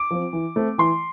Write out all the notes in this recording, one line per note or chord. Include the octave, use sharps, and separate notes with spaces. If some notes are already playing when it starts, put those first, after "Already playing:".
Already playing: D6
F3 C4
E3
A3 C4
E3 C6